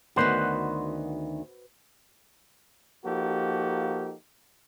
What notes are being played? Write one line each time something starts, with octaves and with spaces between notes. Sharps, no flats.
D2 D#3 B3 F#4 B4 C5
F3 A#3 D#4 F#4 G4 A4